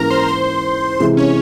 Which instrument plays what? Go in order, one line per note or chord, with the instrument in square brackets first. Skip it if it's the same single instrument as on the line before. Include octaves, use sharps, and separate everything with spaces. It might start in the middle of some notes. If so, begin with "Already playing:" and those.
Already playing: [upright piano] G#2 E3 A#3 C#4 [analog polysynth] A#4 A#5
[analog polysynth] C5 C6
C5 C6
[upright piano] C3 E3 G#3 E4 [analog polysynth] C5 C6
[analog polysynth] C#4 C#5